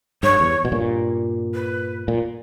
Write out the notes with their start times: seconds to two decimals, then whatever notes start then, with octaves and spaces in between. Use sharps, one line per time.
0.23 G2 C#5
0.40 E2
0.65 B2
0.72 G2 A#2
1.54 B4
2.08 A#2